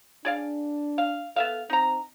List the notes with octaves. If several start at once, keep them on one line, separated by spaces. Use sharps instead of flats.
D4 G#4 D5 F5
F5
B3 A4 E5 F5
C4 D#4 A#5